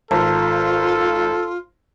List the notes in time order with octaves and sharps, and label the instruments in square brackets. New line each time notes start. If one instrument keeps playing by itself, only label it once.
[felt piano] G#1 A#5 [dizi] F4 [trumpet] A4 [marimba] A5